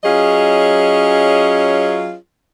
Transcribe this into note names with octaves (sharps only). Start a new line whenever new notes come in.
F#3 C#4 F4 G#4 C#5 D#5